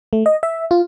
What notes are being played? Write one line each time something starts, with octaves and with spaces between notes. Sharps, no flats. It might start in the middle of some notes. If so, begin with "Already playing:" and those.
A3
D#5
E5
F4